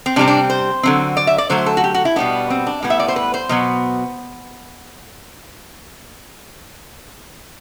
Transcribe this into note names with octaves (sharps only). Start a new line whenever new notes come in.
C4
C3 G3 C4 D4
D4
C5
D3 F#3 C4
D5
E5
D5
D3 F#3 A3 C5
A4
F#4
G4
F#4
E4
B2 G3 B3 D4
C4
D4
A2 G3 B3
E5
D5
C5
B4
C5
B2 F#3 B3